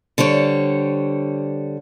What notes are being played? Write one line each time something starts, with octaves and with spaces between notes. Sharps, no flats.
D3 G3 C5 C#5